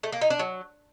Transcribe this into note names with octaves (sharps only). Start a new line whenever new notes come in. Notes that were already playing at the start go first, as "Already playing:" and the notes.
A3
A#3
D#4
D4
F#3